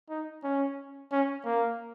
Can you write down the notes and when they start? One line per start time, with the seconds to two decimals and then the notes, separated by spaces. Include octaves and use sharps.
0.09 D#4
0.43 C#4
1.12 C#4
1.45 A#3